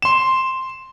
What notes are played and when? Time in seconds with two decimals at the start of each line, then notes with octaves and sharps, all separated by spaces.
0.02 C6 E7